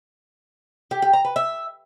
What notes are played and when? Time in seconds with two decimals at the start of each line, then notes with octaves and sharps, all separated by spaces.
0.91 G4
1.02 G4
1.13 A#5
1.25 B4
1.36 E5